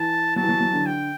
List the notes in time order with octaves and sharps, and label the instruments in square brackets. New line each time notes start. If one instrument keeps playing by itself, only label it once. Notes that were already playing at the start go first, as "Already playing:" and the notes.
Already playing: [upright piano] E3 [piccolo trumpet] A5
[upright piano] F#3 [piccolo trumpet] A5
[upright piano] E3
F#3
F#3
D3
[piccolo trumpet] G5